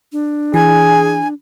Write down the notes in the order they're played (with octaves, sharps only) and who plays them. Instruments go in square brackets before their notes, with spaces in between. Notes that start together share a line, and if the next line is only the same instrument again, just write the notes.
[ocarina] D4
[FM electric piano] E3 [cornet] G#4 [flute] G#5